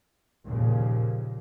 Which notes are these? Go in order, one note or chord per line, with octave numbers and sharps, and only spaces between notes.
D#2 A#2 C#3 F3 A#3